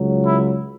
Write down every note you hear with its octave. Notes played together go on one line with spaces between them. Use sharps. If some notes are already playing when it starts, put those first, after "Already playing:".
Already playing: C#2 C#3 F#3
E4